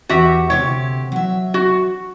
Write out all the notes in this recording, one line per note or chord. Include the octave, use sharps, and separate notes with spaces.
E2 F#4 G4 E5
D2 C3 G4 C#5
F#3 E5
F#4